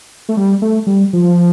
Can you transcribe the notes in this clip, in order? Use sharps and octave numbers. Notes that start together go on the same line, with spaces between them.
A3
G3
A3
G3
F3